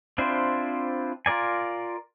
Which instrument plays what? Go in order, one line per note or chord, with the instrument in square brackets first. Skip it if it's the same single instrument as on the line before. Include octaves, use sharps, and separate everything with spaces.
[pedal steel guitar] C4 D4 E4 F4 C5
F4 A#4 D5 G#5